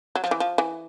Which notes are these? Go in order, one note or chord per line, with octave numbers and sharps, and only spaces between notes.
F#3
F3
E3
F3
E3